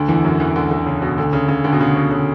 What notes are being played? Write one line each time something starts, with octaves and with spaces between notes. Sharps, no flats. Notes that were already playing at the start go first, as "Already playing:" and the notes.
Already playing: D2 D3
E2 E3
F#2 F#3
E2 E3
D2 D3
D2 D3
C#3
B2
D2 D3
C#3
C#3
D2 D3
B2
C#3
B2
C#3